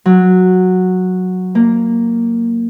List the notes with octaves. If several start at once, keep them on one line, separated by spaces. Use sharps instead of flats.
F#3
A#3